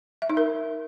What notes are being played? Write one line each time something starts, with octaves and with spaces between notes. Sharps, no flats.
E5
D#4
A#4